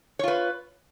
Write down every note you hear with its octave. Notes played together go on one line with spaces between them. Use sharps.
F4 B4 C#5